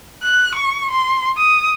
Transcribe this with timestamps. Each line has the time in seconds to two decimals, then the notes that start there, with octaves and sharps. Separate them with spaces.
0.23 F#6
0.55 C#6
0.91 C6
1.38 D#6